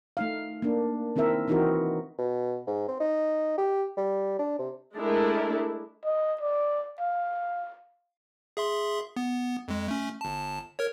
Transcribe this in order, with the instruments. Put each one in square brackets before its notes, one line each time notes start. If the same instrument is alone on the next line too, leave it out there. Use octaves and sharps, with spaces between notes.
[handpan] A3 D#4 F5
A#3 D4
D#3 C4 E4 A#4 E5
E3 C4 D#4 E4 F#4 A#4
[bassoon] B2
G#2
C4
D#4
G4
G3
D4
C3
[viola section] G#3 A3 D4 E4 A#4
[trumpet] D#5
D5
F5
[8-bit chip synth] G#4 E5 C6
B3
F2 G#3
A3 C#4
G1 A5
A#4 C#5